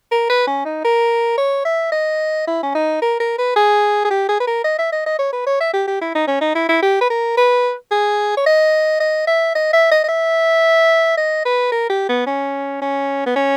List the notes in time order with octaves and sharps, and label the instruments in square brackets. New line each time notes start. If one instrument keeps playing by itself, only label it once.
[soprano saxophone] A#4
B4
C#4
D#4
A#4
C#5
E5
D#5
E4
C#4
D#4
A#4
A#4
B4
G#4
G#4
G4
G#4
B4
A#4
D#5
E5
D#5
D#5
C#5
B4
C#5
E5
G4
G4
E4
D#4
C#4
D#4
E4
E4
G4
B4
A#4
B4
G#4
C#5
D#5
D#5
E5
D#5
E5
D#5
D#5
E5
D#5
B4
A#4
G4
B3
C#4
C#4
B3
C#4